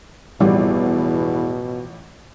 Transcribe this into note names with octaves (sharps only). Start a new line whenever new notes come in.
A1 E2 B2 F3 G3